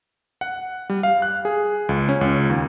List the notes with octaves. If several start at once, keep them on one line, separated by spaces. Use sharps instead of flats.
F#5
G3
F5
F#6
G#4
C#2
C#4
C#2
D#2